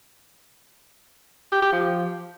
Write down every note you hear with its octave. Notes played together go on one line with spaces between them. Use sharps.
G4
G4
F3